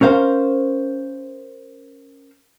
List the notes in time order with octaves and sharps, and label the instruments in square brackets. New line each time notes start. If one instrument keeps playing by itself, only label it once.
[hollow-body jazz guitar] C#4 A#4 C5 F5